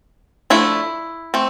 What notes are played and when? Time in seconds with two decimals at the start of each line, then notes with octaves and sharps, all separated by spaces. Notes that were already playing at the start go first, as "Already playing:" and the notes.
0.50 F3 A3 D4 E4
1.34 A3 C4